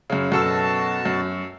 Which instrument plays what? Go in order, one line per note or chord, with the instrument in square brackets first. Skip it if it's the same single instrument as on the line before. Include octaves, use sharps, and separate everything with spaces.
[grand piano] F#2 C#3
[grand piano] F#2 A4 E6 [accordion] B2 F#4 A5
[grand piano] F#2